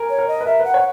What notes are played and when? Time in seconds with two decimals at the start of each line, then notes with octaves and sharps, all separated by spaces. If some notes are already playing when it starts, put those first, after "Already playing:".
Already playing: A#4 G#5
0.10 C#5
0.18 A#4
0.28 D#5
0.41 B4
0.46 A#4 E5
0.60 B4
0.65 F#5
0.74 C#5